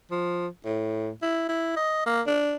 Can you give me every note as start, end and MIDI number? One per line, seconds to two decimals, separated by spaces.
0.11 0.47 53
0.65 1.10 45
1.22 1.45 64
1.49 1.72 64
1.76 2.05 75
2.06 2.22 58
2.27 2.56 62